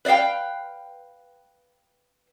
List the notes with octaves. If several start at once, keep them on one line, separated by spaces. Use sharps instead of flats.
B4 D5 D#5 F5 G5